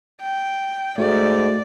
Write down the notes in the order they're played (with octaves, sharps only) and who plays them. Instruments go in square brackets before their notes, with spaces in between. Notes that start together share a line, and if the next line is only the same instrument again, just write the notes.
[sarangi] G5
[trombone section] G#2 [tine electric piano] A3 F#4 [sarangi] D5